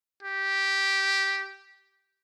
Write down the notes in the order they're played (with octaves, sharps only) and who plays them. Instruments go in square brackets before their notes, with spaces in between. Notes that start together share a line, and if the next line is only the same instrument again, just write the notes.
[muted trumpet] G4